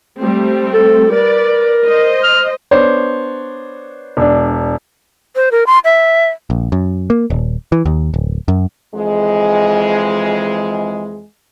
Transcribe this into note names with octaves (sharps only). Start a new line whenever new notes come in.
G3 A3 C4
A4
A#4 B4 D5
C5 D#5
F6
B3 D4 C5 C#5
E1 D4
C5
A#4
C6
E5
A#1
F#2
A#3
D#1
E3
D#2
D1
F#2
F2 E3 G#3